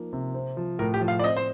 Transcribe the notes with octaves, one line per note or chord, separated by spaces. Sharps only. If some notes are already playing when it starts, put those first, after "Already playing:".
Already playing: F3 A#3 D#4
C3
C4
F3
A2 A#4
G4
F3
F5
D5
C4 D#5
C5